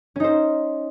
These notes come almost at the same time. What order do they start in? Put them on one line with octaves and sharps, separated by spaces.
C#4 D#4 C5